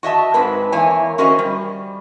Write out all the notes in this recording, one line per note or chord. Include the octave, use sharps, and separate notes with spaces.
F#4 D#5 E5 A5
G#2 G#3 C4 B4
E2 A#3 E4 C#5 G#5
C#4 F#4 A#4 C5 D#5 E5
G3